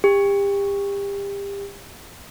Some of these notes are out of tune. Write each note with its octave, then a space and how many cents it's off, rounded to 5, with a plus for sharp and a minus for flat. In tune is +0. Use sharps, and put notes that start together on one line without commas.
G4 +30